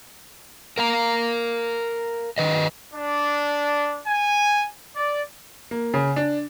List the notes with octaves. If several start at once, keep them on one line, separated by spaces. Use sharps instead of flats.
A#4 F5 A#5
D#3 B4 D#5
D4
G#5
D5
A#3
C#3
D4